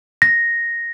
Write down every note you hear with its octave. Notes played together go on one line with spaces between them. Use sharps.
A#6